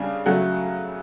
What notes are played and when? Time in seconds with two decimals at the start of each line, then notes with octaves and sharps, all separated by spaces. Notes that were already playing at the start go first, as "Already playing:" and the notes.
Already playing: C#3 G3 D4
0.26 C#3 F#3 A3 F#5